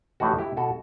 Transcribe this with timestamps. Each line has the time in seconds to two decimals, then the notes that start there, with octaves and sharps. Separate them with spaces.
0.20 A1 A2 E3 D#4 F#4
0.39 E4 G4
0.57 B2 F#4 A4